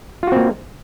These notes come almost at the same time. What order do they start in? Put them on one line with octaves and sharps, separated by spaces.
F4 F#4 C4 A#3